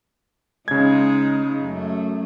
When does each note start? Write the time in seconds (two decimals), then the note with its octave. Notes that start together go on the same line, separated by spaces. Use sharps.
0.68 C#3 G#3 D#4 G#6
1.60 F#2 A3